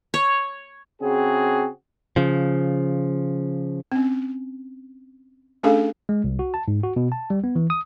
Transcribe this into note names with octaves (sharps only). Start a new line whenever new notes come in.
C#5
C#3 C4 F#4 G#4
C#3 F3
C4 C#4
A3 C#4 D4 G#4 A4 F5
G#3
C2
F#4
A5
G#2
F#4
B2
A5
G3
B3
E3
D#6